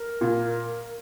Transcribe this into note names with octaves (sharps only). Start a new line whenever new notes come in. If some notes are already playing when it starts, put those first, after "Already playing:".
Already playing: A#4
A#2